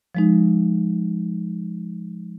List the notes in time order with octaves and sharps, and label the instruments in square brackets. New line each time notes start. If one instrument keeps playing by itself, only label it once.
[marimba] F3 G#3 D#4